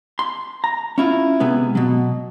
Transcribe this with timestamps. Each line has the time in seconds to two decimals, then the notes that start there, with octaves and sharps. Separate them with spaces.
0.19 C6
0.64 A#5
0.98 C#4 E4 F4
1.40 C3 G#3 B3 G#4
1.75 B2 F#3